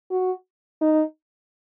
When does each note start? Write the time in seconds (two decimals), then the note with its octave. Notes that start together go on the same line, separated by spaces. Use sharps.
0.11 F#4
0.81 D#4